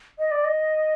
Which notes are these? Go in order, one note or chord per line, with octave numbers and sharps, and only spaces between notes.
D#5
D5
D#5